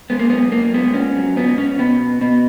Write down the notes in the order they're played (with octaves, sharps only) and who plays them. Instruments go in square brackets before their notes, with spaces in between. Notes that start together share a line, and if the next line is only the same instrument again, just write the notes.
[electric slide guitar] G#3 B3
A#3
F#2 B3
F#2 A#3
G#3 B3
G#2 C#4
F#3
G#2 B3
G#2 C#4
B2 B3
B2
B2 B3